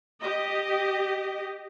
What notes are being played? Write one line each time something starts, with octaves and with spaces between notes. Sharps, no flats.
G4 D#5